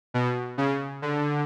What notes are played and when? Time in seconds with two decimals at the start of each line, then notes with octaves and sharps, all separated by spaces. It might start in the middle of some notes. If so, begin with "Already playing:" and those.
0.14 B2
0.58 C#3
1.02 D3